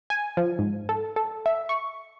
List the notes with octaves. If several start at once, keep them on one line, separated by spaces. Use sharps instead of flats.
G#5
F3
G#2
A4
A4
E5
C#6